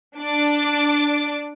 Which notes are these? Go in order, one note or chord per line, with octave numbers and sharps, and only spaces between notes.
D4 D6